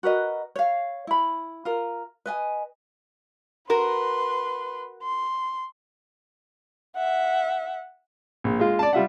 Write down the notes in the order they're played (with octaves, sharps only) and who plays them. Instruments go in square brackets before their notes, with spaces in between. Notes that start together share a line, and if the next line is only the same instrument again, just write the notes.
[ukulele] F#4 A#4 B4 D#5
C#5 F5
E4 B5
F4 A#4
B4 D#5 G#5
[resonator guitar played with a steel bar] F#4 A#4 [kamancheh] B4 C6
[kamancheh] C6
E5 F#5
[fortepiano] A#1
G#3 F4
D5 A5
G3 F4 E5 F#5